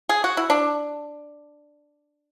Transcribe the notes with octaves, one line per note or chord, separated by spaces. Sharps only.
G#4
F#4
E4
D4